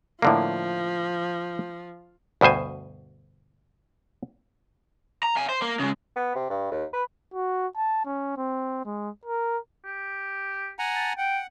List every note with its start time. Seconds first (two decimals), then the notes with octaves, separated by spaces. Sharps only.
0.22 A2 D3 F3 A#3
2.41 D2 G2 B2 C5 G#5
5.23 A#5
5.37 F5 G#5
5.49 C5
5.62 A#3
5.79 C#3 G#3
6.16 B3
6.35 C3
6.50 G2
6.72 D#2
6.93 B4
7.34 F#4
7.76 A5
8.06 C#4
8.37 C4
8.85 G#3
9.25 A#4
9.85 G4
10.79 F#5 G#5 A#5
10.96 A5
11.18 F#5 G5